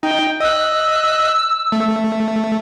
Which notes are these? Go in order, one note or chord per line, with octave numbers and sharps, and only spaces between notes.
D#4 G5
D#5 E6 F#6
A3